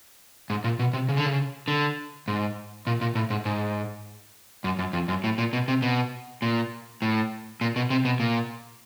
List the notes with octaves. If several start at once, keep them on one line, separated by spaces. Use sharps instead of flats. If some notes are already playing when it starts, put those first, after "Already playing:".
G#2
A#2
B2
C3
C#3
D3
C#3
D3
G#2
A#2
A#2
A2
G#2
G#2
F#2
F#2
F2
F#2
A2
A#2
B2
C3
B2
A#2
A2
A#2
B2
C3
B2
A#2